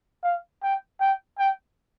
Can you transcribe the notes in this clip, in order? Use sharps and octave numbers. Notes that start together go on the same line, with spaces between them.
F5
G5
G5
G5